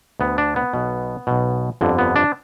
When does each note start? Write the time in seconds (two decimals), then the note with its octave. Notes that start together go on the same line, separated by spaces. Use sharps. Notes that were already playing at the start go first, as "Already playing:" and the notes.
0.20 D2 D3 B3
0.38 D4
0.56 B3
0.73 B1 B2
1.27 B1 B2
1.81 G1 F2 D3
1.98 B3
2.16 D4